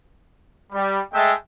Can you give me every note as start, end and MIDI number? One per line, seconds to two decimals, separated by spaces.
0.72 0.98 55
1.13 1.33 56
1.13 1.33 57
1.13 1.33 76
1.13 1.33 79
1.13 1.33 81